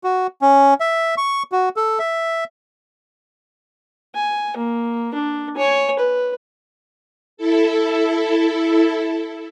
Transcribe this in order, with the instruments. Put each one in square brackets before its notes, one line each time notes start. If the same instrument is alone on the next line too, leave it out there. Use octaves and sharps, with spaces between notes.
[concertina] F#4
C#4
E5
C#6
F#4
A4
E5
[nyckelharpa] G#5
A#3
D4
C#5 G#5
B4
[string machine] E4 A4